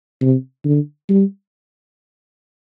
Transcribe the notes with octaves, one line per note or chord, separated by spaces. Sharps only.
C3
D3
G3